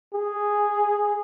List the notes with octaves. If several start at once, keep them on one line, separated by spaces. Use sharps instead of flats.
G#4